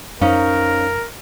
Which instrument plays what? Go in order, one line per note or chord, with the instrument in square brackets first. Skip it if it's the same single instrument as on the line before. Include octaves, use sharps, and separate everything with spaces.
[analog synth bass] F#2 [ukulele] C#4 D#4 [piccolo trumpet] A#4 [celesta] C5 F5